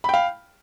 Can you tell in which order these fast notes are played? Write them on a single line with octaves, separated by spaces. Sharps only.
B5 G5 F5